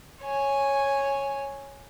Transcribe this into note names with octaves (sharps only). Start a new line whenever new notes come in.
C#5 G#5